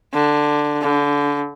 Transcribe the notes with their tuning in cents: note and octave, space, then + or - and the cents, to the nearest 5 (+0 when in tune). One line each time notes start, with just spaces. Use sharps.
D3 +10
D3 -25